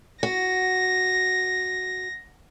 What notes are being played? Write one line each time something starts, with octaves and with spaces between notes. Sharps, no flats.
F#4 A#6